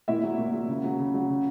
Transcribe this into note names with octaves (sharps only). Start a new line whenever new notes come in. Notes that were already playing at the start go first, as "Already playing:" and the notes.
A#2 E4 E5
F#3
A#2
F#3
C#3
F#3
C#3
F#3
C#3